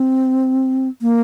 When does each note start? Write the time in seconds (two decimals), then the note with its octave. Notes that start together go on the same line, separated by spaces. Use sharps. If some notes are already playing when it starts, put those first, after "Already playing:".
Already playing: C4
1.02 A#3